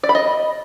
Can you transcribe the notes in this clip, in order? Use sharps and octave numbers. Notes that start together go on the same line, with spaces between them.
D5
B5
D#5